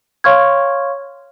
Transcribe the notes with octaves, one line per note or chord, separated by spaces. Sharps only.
C#5 F5 C6 C#6 F6 G#6